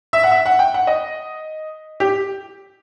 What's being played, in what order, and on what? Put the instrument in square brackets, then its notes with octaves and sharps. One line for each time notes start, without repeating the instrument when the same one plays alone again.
[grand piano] E5
F#5
E5
F#5
G5
F#5
D#5
G4